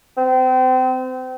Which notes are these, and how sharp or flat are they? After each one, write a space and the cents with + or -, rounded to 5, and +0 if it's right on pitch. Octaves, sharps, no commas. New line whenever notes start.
C4 -30